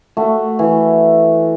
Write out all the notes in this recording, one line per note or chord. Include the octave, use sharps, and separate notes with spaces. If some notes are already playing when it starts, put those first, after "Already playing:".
A3 F#4
E3